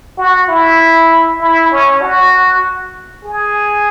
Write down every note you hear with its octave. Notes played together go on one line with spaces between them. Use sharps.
F#4
E4
E4
C#4
F#4
G#4